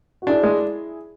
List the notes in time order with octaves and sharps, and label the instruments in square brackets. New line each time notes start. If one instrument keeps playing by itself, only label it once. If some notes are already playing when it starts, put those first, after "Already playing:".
[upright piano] F#4
[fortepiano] D4 [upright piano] E4 G#4
[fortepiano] G#3